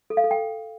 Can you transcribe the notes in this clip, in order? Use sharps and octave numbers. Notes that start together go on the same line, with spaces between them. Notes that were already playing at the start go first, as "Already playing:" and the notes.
A4
F5
A4
G5